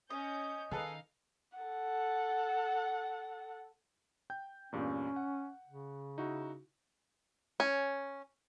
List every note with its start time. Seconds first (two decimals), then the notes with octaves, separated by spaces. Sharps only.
0.10 C#4 D#5 G6
0.71 D#3 D#4 G#4 A4 B4 F5
1.58 A4 F#5
4.30 G5 G6
4.72 E2 G2 A#2 C#4
5.16 F#5
5.67 C#3
6.18 D#4 E4 F#4
7.60 C#4